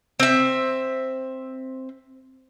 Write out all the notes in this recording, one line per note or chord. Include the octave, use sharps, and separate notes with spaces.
C4 E5